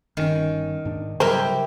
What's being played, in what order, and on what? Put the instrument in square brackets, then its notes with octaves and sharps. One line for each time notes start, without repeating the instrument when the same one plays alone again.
[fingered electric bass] G1 B2 C#4 [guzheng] D#3
[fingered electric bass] G#2 D4
[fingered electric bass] C#3 F#3 G3 [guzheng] E4 G4 G5 [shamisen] A#4 C5